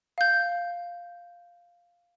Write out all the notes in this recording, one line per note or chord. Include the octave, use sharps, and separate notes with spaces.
F5 G6